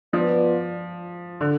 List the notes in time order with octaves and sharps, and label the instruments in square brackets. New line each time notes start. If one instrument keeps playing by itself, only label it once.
[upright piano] F3 [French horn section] B3 F4 B4 D5
[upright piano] D3